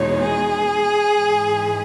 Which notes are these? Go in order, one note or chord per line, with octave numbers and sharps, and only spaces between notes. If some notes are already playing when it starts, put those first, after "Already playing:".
Already playing: E2 B2 G#3 D#4 C#5
G#4
G#2 E3 G#3